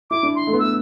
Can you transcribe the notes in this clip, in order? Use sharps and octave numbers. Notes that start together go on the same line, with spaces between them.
E4 D6
D4
C6
A3
B3
A3 E6